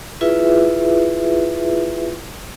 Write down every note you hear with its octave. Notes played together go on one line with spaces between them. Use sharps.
E4 F4 G#4 B4 E5